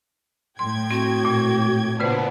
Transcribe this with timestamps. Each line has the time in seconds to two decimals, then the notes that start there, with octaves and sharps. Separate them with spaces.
0.59 A2 G5 C6 G#6
0.91 C4 F#4
1.25 A#2
2.00 A#2 C#3 B3 D4 B4 C5